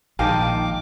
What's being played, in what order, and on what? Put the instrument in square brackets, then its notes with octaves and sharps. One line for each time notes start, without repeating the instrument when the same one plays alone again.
[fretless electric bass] A#1 [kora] D#3 G#3 [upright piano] F5 G5 A5 [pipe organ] D6